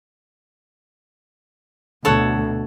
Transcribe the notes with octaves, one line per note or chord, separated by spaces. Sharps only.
D2 B2 A4 C#5 F#5